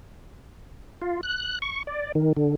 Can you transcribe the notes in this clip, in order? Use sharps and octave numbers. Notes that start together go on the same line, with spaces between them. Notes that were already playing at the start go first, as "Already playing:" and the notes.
F4
F#6
C#6
D5
D#3
D3